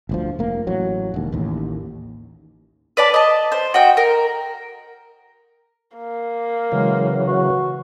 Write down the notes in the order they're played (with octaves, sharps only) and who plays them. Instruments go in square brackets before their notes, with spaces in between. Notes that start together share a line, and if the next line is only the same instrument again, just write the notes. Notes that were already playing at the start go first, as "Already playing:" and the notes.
[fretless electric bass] G1 D2 F3
F1 A#3
A1 F#3
E1 D#2
A1 D#2
[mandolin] B4 D5 A5
D#5 A5
C5
F#4 D#5 G5
A#4
[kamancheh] A#3
[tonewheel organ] C#3 E3 F#3 [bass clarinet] G#3
[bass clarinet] F#4